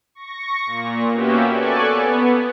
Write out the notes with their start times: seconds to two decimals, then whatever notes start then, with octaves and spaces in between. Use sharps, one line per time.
0.15 C#6 A#6
0.66 A#2
1.11 A#3 B3 C#4 F#4 G4 E5
1.52 A4 D5 G#5 C#6 F#6
1.89 B3